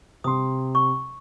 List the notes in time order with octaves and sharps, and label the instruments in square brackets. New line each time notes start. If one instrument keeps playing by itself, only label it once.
[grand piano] C3 C6 [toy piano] D#6
[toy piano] C#6